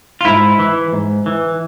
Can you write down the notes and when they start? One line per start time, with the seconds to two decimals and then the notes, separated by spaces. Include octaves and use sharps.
0.21 F4
0.25 G#2 E4
0.59 E3
0.93 G#2
1.26 E3